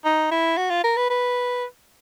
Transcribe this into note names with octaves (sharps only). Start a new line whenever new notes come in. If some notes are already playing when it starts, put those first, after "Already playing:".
D#4
E4
F#4
F4
A#4
B4
B4